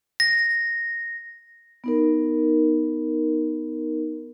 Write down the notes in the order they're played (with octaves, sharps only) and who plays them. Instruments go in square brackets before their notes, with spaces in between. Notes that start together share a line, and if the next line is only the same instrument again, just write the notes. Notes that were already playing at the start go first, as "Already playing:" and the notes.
[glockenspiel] A#6
[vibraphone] B3 D#4 A#4